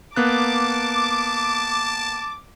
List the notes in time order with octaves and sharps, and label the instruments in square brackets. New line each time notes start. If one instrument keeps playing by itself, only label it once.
[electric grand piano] A#3 B3 F#6 [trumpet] A5 [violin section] D6